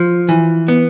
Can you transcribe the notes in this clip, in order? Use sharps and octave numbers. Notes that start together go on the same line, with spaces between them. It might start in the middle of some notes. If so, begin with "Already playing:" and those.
Already playing: F3
E3
B3